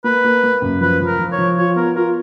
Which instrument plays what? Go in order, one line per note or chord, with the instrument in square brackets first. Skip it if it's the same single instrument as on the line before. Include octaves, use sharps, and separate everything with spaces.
[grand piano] A#3 [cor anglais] B4
[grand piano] A#3
A#3
F#2
[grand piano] F3 [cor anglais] B4
[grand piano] F3
[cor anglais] A#4
[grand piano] F3
[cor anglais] C#5
[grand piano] F3
[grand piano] F4 [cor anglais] C#5
[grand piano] B3 [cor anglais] A#4
[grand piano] F4 [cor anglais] A#4